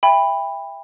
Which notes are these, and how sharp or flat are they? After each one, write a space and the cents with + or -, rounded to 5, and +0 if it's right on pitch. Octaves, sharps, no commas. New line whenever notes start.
E5 +0 G5 +30 B5 +0